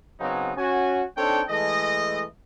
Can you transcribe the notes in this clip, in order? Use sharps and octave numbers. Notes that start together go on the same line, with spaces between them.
C#3 F#3 B3 C4 D#4
C#4 F#4 G#5
C4 D4 D#4 A4 C#5 G5
E3 G#3 A3 A4 D#5